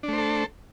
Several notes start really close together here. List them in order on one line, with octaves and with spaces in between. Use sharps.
D4 A3 C5 A4